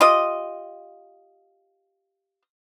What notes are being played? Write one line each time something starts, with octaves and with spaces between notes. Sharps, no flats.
F4 G4 D#5